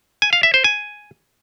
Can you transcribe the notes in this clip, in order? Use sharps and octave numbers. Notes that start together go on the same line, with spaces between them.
G#5
F5
E5
C5
G#5